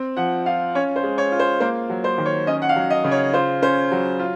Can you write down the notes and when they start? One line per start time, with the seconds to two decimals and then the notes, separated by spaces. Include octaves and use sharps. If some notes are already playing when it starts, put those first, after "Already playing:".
Already playing: C4
0.17 F3 F#5
0.46 F4 F5
0.75 C#4 C#5
0.96 C5
1.03 G#3
1.18 C#5
1.32 F4
1.39 C5
1.60 A#3 C5
1.90 F#3
2.04 C5
2.18 D#3
2.26 C#5
2.47 C#4 D#5
2.62 F#5
2.69 F5
2.76 F#3
2.90 D#5
3.04 C#3
3.11 C#5
3.33 F4 C5
3.62 C#4 C5
3.92 F#3
4.19 F4